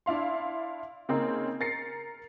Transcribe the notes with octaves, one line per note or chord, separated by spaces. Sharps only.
D4 E4 F5 C6
C#3 A#3 C4 D#4
A#4 A6 A#6 C7 C#7